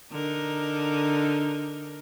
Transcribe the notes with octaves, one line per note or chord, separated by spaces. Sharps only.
D3 D#4 A#4